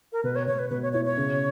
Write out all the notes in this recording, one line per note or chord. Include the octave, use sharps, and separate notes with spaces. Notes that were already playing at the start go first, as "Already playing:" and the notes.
A#4
B2 B4
C#5
B2 C#5
B4
B2 B4
C#5
E4 C#5
C#5
C#3